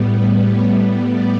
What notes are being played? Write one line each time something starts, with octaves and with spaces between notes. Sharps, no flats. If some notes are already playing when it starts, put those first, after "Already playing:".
Already playing: A2 G3 B3
B4
C#5
D5